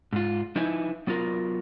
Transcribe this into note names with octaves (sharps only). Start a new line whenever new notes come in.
G#2 F4
F3 D#4 E4 B4 E5 G#5
F#3 B3 F4 A#4